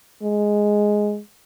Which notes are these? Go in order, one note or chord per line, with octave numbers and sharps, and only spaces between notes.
G#3